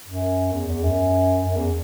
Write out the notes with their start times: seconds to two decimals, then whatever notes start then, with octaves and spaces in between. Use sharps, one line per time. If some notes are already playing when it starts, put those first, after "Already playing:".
0.08 F#2
0.53 E2
0.68 E2
0.84 F#2
1.43 F#2
1.56 E2